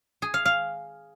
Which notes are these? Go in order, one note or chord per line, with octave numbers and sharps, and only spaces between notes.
G#4
F5
F5